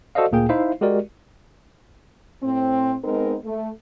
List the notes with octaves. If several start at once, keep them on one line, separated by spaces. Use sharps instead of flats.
F#4 A4 C5 D5 D#5 F5
D2 A#2 A#3 G#4 G5
D#4 E4 C5 E5 F5
G#3 F#4 G4 A#4 D5
A2 C4
G#3 B3 C4 D#4 A#4
A3